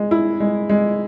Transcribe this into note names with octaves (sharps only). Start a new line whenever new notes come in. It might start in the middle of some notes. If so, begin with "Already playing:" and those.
Already playing: G#3
E4
G#3
G#3